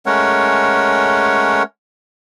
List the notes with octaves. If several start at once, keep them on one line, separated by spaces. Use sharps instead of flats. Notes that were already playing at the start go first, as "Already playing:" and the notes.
G#3 A3 C#4 A#4 C#5 F#5